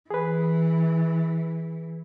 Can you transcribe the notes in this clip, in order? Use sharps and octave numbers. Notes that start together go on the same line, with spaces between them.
E3 G#4 B4